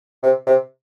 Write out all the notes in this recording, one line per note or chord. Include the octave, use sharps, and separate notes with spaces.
C3
C3